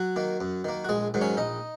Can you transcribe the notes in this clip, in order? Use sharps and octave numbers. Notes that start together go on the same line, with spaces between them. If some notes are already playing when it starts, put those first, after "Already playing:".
Already playing: F#3 F#4
D#3 A#3
F#2
D#3 A#3
F#4
A#1 G#3 G#4
G#2 D#3 F#3
C#4 C#5
A#1 D#4 D#5